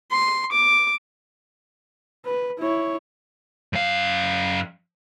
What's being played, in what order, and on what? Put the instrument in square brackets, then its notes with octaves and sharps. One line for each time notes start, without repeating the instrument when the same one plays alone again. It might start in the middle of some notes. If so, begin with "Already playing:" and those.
[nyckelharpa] C6
D6
[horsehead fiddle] B4
E4 C#5
[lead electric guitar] F#2 F5